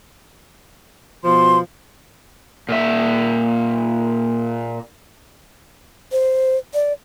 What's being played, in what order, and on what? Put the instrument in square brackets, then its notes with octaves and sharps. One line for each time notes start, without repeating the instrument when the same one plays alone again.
[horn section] B2 F3 [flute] C6
[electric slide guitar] A#2 E5
[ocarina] C5
D5